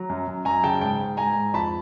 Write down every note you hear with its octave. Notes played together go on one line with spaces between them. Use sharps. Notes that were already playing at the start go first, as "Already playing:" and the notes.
Already playing: F#3 A#5
F#2
F#2
F#2 G#5 A#5
C#3 G5 A5
G#2 G5 A5
G#2
G#2 G#5 A#5
G#2
F2 A5 B5